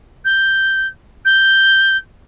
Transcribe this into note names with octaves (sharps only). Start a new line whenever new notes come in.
G6
G6